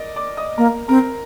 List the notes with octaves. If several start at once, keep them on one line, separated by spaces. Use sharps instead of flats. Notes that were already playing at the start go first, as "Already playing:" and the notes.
Already playing: A#4 D5 D#5
D5 D6
D#5 D#6
A#3 A#4 A#5
C4 A#4 A#5